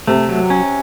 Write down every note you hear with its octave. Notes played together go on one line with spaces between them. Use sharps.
C3 A3
F#3
C#4